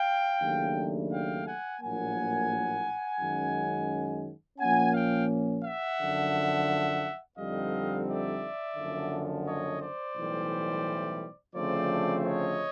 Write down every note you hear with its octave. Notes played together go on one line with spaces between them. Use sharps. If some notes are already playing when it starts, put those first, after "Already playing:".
Already playing: F5 G5
D#2 C#3 F#3 A3 D4
F5 G5
F#5 G#5
A#1 A2 F#3 A#3 F#5 G#5
F#2 D#3 G#3 C#4
A#2 F3 A#3 C#4 F#5 G#5
F5 G5
E5 F#5
F#2 D3 F3
F2 D3 G3 C4 D#4 D#5 F5
D5 E5
F#1 F#2 D3 F3
C#5 D#5
C5 D5
B1 A2 E3 G3
D2 C#3 F3 A3 C4 C5 D5
C#5 D#5